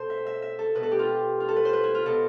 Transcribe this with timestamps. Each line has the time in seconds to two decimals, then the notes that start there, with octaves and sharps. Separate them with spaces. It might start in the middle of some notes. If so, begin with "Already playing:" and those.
Already playing: B2 A4 C5
0.10 E5
0.26 E5
0.42 E5
0.59 A4
0.75 B2 B4
0.83 A4
0.91 G4
0.99 F4
1.40 F4
1.48 A4
1.56 B4
1.65 C5
1.73 B4
1.84 E4
1.95 F4
2.05 B2 A4